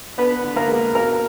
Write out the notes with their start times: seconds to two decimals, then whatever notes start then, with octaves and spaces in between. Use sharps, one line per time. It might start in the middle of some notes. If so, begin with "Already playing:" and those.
0.17 B3 D4 B4
0.44 D3
0.56 A#3 A#4
0.69 G#3
0.95 B2 A#3 A#4